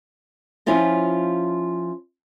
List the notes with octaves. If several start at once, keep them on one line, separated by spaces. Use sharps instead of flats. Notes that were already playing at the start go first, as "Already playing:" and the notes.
F3 C#4 E4 F4 D#5